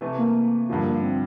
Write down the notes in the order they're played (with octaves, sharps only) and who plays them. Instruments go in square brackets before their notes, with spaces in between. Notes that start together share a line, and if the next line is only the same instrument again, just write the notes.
[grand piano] C3 E3 A3
[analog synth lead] A#3
[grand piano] G2 D3 F3
[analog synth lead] C4